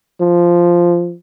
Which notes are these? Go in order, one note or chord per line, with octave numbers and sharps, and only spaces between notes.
F3